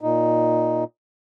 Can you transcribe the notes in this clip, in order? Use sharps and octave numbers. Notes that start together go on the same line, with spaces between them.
A#2 D#4